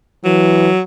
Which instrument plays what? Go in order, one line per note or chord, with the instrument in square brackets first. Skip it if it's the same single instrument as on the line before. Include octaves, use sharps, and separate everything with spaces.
[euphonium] E3 [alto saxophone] F#3